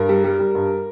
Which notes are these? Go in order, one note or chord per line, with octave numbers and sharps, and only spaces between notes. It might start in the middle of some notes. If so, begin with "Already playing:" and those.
Already playing: G2 A#4
G3
G3
G3
G2